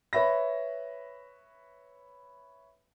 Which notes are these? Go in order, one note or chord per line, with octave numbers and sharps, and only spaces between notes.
B4 C#5 E5 B5 A#6